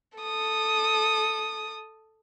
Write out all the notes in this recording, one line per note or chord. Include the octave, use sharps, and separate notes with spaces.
A4 D#6